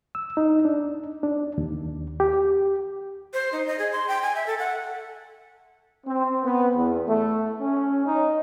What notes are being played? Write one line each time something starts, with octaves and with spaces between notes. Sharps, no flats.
E6
D#4
D4
D4
D#2
G4
C5
D#4
D#5
G#4
C6
G5
G#5
E5
A4
F#5
C4
B3
E2
A3
C#4
D#4